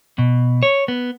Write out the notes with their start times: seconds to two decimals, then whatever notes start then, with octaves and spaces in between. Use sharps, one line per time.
0.18 B2
0.63 C#5
0.88 B3